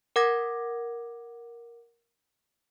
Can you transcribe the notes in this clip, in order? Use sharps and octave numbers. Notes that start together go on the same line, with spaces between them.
A#4 F#5 D6 G#6 A#6